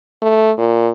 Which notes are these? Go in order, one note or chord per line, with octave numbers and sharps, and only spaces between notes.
A3
A#2